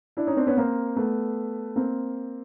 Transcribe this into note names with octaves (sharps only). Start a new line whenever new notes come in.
D4 E4
C#4 D#4
C4 D4
B3 C#4
A#3 C4
A3 B3
A#3 C4